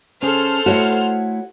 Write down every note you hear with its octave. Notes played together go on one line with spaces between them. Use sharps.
C#4 G#4 A4 C5 F6
A3 E4 F#4 C#5 F#5